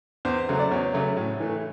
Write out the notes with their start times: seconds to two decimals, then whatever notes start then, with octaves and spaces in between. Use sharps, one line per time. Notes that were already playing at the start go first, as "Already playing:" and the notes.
0.25 E2 C5
0.49 C#3 F#3 A3
0.59 D5
0.71 E2 C#5
0.94 C#3 F#3 A3
1.17 A2
1.40 E3 A3